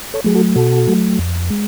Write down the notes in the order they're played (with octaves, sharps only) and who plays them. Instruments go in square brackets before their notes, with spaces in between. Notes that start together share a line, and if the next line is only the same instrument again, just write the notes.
[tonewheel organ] A4 C#5
F#3 A3 G#4
F#4 A4
B2 F#4 A4
F#3 A3
F2
G#3